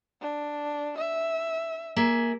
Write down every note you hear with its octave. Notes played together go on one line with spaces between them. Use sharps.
D4
E5
A#3 G#4 E5